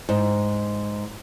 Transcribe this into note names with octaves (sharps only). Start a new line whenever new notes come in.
G#2